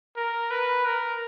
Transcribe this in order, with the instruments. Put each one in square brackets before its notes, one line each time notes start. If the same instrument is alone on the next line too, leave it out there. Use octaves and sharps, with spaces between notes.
[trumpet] A#4
B4
A#4